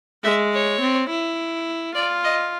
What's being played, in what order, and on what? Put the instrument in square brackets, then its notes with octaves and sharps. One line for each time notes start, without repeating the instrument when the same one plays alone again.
[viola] G#3 [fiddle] E5
[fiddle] C#5
[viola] C4
E4
[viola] F4 [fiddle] D5
[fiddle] D#5